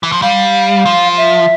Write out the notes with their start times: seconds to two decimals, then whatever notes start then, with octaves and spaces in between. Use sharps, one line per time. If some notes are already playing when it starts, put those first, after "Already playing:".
0.03 E3
0.12 F3
0.22 G3 F5
0.86 F3
1.18 E5